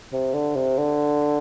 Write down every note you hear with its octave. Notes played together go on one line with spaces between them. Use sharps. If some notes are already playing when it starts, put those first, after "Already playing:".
C3
D3
C3
D3